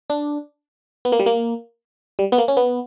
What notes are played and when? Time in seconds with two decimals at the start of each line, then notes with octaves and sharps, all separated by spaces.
0.10 D4
1.05 B3
1.12 A#3
1.20 G3
1.26 A#3
2.19 G3
2.32 B3
2.38 A#3
2.48 C#4
2.57 B3